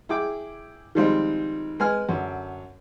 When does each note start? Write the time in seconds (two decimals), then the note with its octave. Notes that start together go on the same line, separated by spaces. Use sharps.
0.09 E4 G#4 G5 D6
0.95 D#3 F3 G3 G#3 C4 F4
1.80 G#3 B4 G#5 F6
2.09 F#2 D3